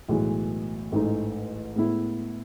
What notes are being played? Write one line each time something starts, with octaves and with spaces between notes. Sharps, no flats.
B1 A2 E3 G#3
A1 G#2 E3 A3 D#4
A2 G#3 B3 E4